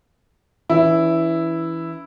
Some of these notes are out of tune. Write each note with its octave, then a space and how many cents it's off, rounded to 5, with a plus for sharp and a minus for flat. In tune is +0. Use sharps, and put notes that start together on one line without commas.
E3 +0 C#4 +35 E4 +0